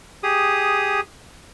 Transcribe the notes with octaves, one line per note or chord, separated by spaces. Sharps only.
G4 G#4 D#6